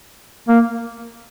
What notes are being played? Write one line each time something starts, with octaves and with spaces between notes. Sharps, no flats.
A#3